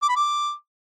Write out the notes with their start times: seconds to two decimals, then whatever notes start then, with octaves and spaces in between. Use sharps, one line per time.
0.02 D6
0.09 B5
0.16 D6